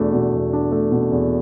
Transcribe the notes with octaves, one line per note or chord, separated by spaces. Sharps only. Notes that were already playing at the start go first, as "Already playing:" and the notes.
Already playing: E2 B2 A3 D4
B2
E2
D4
A3
B2
E2